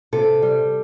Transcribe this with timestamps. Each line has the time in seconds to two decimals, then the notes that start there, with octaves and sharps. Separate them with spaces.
0.13 C3 A4
0.42 G3